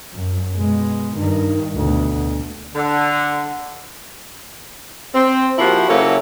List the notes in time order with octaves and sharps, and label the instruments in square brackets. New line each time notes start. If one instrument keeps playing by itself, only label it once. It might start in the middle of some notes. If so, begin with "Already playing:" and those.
[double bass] F#2
B2 G#3
G2 D#3
D2 B2
[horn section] D3
[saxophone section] C4
F3 A#3 E4 F#4 G4 C5
C#3 F#3 A#3 E4 F#4 A4